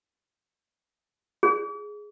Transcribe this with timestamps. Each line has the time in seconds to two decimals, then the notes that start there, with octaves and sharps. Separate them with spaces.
1.43 G#4